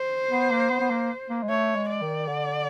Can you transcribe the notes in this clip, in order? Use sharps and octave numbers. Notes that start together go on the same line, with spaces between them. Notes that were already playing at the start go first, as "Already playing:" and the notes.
Already playing: C5
B3
A#3
B3
B3
A#3
A#3
G#3
A3 C#5
G#3
D5
D#3
D3